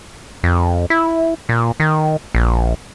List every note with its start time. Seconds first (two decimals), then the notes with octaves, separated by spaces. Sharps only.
0.43 F2
0.90 E4
1.49 A#2
1.80 D#3
2.35 A#1